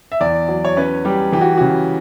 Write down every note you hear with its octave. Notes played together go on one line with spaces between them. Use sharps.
E5
E2 D5
F#3
C#5
C#4 B4
G3 G4
E3 G4
F#4
C#3 F#4